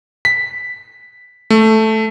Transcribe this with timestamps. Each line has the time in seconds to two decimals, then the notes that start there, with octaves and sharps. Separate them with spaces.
0.25 B6
1.50 A3